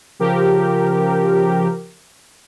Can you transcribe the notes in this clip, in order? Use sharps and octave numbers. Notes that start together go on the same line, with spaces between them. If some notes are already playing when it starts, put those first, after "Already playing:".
C#3 F3 G4 A#4